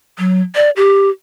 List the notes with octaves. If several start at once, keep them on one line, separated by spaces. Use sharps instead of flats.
F#3
D5
G4